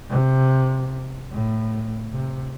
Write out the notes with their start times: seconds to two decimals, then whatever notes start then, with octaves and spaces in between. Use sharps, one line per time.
0.10 C3
1.31 A2
2.11 C3